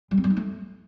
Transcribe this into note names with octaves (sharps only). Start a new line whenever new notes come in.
G3
C4
G3
D#4
A3